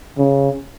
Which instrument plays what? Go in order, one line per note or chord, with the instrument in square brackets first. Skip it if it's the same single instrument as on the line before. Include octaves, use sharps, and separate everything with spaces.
[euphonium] C#3